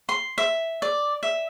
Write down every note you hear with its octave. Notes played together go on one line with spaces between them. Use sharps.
C6
E5
D5
E5